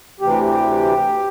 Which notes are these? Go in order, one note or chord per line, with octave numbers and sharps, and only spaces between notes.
D2 C3 E3 G4
G4